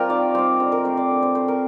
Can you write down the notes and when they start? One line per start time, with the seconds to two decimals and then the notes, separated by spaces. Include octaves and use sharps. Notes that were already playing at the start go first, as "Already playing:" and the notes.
Already playing: G3 C4 F4 G4 A#4
0.09 D#3 D5
0.35 G3 C4 C5
0.60 D3 C5
0.72 A#4
0.85 A3 C4 C5
0.97 D5
1.10 D3
1.23 C5
1.35 A3 C4 C5
1.48 A#4